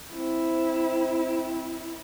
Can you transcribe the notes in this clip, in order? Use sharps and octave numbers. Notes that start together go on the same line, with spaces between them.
C4 E4